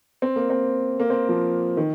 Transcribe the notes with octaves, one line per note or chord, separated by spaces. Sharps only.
C4
A#3
C4
A#3
C4
F3
D#3